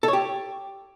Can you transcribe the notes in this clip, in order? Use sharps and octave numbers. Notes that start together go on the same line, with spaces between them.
A4
C#5
G4